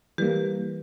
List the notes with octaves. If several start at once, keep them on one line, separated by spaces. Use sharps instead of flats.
E3 G3 A#3 G4 B4